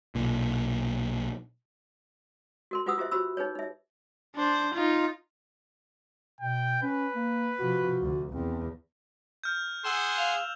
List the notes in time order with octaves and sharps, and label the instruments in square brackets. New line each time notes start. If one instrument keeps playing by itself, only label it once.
[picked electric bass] B1 A#2
[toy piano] F#4 A#4 C6
F4 G4 B4 F#5 D#6 E6
F4 G4 C5 E5
F#4 G4 C5 B5 E6
D#4 G#4 B4 C#5
D#4 E5
[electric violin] D4 C5
D#4 F4
[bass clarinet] B2 [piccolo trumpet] G5
[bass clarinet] C#4 [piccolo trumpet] B4
[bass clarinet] A#3
[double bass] C3 F3 [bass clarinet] F#4
[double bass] D2
[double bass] E2 [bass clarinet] C4
[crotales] F6 G6
[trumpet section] G#4 F#5 C6 [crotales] E6 E7
[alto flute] F5 [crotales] F7